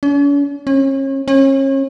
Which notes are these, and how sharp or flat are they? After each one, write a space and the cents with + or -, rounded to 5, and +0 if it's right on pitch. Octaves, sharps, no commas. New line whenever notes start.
C#4 +45
C#4 -35
C#4 -35